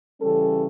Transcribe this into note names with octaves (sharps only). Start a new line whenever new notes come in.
C#3 E3 G3 C#4 A4